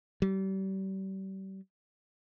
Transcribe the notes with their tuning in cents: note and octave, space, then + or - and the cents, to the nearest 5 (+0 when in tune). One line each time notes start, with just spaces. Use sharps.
G3 -35